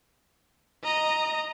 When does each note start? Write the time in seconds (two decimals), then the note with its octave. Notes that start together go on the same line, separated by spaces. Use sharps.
0.84 D#5 A#5